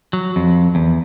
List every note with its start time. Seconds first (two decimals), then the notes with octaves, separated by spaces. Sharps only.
0.13 F#3
0.36 F2
0.75 E2